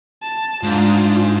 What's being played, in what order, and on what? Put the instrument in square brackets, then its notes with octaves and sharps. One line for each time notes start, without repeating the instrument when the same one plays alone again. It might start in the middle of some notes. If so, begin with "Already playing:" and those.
[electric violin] A5
[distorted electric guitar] G#2 [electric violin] D4 F4